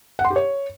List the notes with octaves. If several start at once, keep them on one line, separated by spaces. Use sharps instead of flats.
F#5
C6
G4
C#5